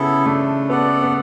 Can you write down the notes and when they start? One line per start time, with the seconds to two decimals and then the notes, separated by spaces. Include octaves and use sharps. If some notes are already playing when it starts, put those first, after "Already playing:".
Already playing: C#3 B3 E4 A4
0.25 A3 D4
0.69 B3 A4 D5 F#5
1.02 B3